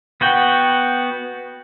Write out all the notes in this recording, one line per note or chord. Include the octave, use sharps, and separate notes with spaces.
B3 F#4 G5